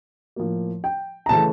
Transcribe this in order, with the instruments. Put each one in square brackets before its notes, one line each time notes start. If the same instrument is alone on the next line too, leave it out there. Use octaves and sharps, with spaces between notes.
[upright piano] A2 F3 A#3
G5
A#5
C#3 E3 A3 A5